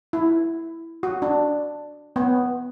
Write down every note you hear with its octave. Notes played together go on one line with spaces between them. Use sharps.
E4
F#4
D4
B3